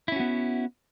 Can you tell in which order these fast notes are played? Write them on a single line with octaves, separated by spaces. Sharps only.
E4 C#4 F#4 B3